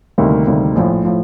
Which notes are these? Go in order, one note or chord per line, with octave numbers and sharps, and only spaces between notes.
D2 C3 D#3 G3 A#3
D2 C3 D#3 G3 A#3
A#1 A2 F3
A2 F3